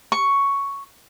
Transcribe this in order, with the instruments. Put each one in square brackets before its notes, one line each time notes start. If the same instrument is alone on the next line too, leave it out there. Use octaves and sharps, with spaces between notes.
[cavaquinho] C#6